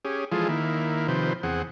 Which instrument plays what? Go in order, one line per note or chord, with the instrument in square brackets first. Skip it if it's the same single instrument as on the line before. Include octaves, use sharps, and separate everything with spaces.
[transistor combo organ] C#4 G4 G#4
E3 F3 G#3 F4 G#4 A4
D#3 A#3 E4
C3 D#3 F3 B4 C5
E2 C4 G#4 F#5